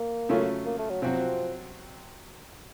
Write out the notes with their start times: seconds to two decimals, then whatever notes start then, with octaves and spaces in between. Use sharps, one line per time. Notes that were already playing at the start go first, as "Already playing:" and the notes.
Already playing: A#3
0.29 C#3 F#3 A3 C#4 F4
0.66 A#3
0.78 A3
0.90 F#3
1.02 C3 F3 F#3 C4 F#4